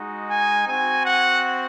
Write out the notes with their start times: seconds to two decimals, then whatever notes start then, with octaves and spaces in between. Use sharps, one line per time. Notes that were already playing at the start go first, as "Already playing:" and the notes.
Already playing: G#3 D#4 F#4
0.29 G#5
0.66 C4 F#4 G#5
1.04 F#5